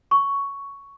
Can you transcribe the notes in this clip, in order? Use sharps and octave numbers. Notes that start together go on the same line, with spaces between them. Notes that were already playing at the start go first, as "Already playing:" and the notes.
C#6